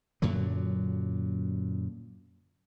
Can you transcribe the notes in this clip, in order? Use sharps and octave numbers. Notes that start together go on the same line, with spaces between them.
F#2 A#2 D3 F#3